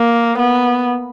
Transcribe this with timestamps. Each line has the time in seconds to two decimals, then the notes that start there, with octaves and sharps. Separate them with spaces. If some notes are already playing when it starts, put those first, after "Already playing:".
Already playing: A#3
0.39 B3